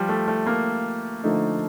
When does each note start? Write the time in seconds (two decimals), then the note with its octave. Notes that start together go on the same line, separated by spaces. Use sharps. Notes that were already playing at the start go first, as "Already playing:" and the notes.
Already playing: F3 G3
0.09 A3
0.28 A3
0.47 A#3
1.23 D3 F3 A3 D#4 A#4